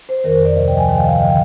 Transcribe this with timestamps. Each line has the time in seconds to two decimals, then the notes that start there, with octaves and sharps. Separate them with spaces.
0.09 C5
0.24 F2 D#3 A#4
0.35 C5
0.45 D5
0.56 D2 C3 F3 D#5
0.68 G5
0.77 G#5
0.88 G#2 D#3 G5
0.98 F5
1.04 D#5
1.20 D3 F3 G5